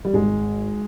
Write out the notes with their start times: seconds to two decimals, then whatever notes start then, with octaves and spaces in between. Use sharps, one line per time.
0.05 G3
0.14 G#1 G#3